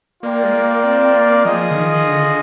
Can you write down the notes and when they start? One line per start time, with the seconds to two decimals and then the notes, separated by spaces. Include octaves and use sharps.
0.23 A#3 F4 A#4 D5 G5
0.44 G#3
0.54 A#3
0.84 C4
1.15 A#3
1.45 F3 F4 G#4 D#5
1.71 D3
1.77 D#3
2.08 D3